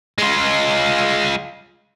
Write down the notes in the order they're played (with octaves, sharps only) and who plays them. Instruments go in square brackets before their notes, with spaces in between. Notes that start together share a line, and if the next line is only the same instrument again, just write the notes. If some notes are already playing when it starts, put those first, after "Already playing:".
[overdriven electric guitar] G#3 F4